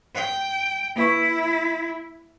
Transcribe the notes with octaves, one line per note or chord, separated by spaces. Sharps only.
G5
A#3 E4 B4 C#6